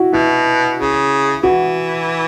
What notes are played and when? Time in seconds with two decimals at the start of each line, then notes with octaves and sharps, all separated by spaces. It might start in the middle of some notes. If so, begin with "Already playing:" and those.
Already playing: E4 F#4
0.13 B2 E4
0.79 C#3
1.43 E3 F#4